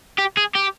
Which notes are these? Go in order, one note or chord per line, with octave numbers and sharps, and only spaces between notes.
G4
G#4
G4